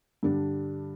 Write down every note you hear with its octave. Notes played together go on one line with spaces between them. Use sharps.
G2 D3 G3 D4